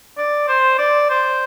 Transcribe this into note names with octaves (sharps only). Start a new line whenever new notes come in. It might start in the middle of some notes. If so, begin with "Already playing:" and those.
D5
C5
D5
C5